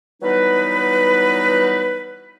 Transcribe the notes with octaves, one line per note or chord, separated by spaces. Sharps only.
E3 F#3 G3 B3 D#4 B4